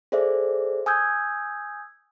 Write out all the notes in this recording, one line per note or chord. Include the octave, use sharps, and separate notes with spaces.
G#4 A4 C5 D5 E5
G#5 D#6 E6 G6 G#6